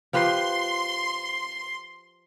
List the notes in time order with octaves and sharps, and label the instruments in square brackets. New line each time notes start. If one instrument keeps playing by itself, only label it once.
[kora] F3 G4 B4 [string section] C6